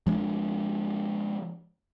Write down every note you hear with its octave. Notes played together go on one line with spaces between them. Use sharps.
F3 G#3 C#4 D4